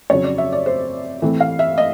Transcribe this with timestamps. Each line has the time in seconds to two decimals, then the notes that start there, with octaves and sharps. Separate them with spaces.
0.10 F2 C#3 F#3 C#5
0.24 D5
0.38 E5
0.52 D5
0.66 C5
1.22 A2 E3 A3 C4
1.40 F5
1.59 E5
1.78 D#5